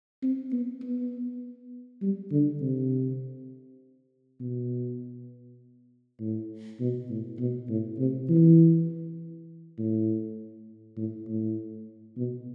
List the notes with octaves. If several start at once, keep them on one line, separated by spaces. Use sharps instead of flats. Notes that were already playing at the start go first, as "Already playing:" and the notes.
C4
B3
B3
G3
D3
C3
B2
A2
B2
A2
B2
A2
C3
E3
A2
A2
A2
B2